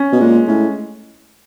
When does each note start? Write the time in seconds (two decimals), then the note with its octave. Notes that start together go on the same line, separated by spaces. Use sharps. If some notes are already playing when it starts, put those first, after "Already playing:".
Already playing: C#4
0.12 B2
0.21 A#2 G#3
0.48 A2 C#4